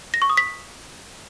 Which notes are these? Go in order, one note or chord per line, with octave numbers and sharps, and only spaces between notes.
A#6
C#6
D#6
B6